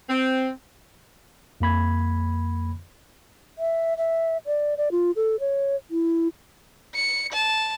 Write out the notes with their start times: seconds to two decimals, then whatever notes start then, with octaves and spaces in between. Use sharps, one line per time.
0.10 C4
1.60 F2 A#3 B5 G#6
3.59 E5
3.97 E5
4.46 D5
4.77 D5
4.92 F4
5.16 A4
5.40 C#5
5.91 E4
6.95 C#7
7.33 A5